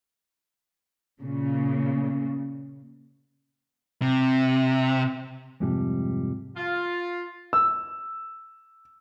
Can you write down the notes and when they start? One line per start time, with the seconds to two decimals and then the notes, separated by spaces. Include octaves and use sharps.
1.20 A#2 C#3
4.02 C3
5.60 F2 G#2 C3 F3 G3
6.57 F4
7.53 E6